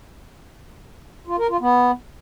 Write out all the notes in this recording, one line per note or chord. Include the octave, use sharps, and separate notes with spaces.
F4
A#4
F4
B3